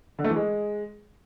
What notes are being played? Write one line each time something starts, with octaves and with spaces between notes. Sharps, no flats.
D3
A3
E3
G#3